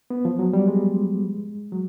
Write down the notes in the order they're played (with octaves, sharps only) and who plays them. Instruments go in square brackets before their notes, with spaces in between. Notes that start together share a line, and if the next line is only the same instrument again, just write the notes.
[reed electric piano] B3
F3
F#3
G3
G#3
F#3